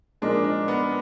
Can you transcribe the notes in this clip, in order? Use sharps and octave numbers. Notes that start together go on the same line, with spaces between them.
A#2 F3 G#3 D4 D#4 A#4
D4
B3